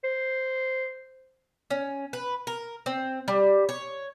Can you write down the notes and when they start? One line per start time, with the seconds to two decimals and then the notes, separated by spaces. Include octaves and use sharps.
0.04 C5
1.70 C#4
2.13 B4
2.47 A#4
2.86 C4
3.28 G3
3.69 C#5